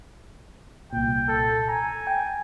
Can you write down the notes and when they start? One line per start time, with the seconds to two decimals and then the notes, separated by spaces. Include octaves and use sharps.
0.93 C2 A#2 G5
1.28 A4
1.69 G#5 A#5
2.07 G5